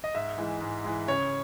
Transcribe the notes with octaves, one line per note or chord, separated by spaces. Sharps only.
D#5
G#2 E5
E3 G#3
G#2
E3 G#3
C#3 C#5